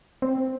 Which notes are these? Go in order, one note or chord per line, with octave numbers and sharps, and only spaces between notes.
C4